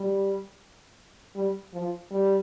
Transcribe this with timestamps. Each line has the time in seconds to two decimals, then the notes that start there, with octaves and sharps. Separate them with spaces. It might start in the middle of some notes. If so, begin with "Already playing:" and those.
Already playing: G3
1.35 G3
1.73 F3
2.11 G3